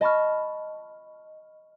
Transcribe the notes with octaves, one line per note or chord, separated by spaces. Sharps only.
D#5 A5 B5 C#6 F6